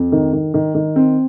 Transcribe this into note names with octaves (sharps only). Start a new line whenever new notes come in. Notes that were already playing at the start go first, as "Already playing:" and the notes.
Already playing: F2
D#3
D#3
D#3
D#3
C4